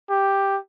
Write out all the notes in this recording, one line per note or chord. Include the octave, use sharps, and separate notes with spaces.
G4